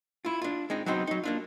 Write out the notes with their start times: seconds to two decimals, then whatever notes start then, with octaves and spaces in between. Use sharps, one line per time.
0.25 E4 F4
0.42 D4 F4
0.70 G#3 C4 D#4
0.86 F#3 B3 C4 D#4 C5
1.07 F#3 D#4
1.24 A#3 D4 F4